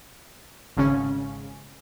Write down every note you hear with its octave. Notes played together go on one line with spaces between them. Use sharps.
G#1 C#3 C#4